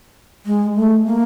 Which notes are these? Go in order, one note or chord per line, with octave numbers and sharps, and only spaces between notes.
G#3
A3
A#3